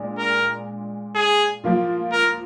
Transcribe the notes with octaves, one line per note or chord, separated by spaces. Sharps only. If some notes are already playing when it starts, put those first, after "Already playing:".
Already playing: A#2 G#3 D4
A#4
G#4
F3 A#3 F4
A#4